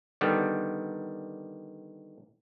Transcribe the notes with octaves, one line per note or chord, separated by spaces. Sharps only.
D3 D#3 G3 B3